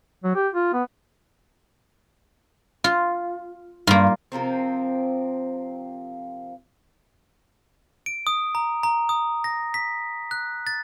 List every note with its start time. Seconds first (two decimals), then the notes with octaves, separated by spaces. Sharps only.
0.24 F#3
0.35 G4
0.53 F4
0.73 B3
2.84 F4
3.87 G2 A#3 F4
4.32 C3 F3 A#3 C4
8.06 D7
8.27 D#6
8.55 A#5
8.83 A#5
9.09 D#6
9.44 A#6
9.74 B6
10.31 F#6
10.67 A6